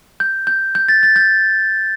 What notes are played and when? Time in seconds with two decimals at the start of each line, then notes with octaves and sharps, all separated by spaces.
0.20 G6
0.47 G6
0.75 G6
0.89 A6
1.03 A6
1.16 G6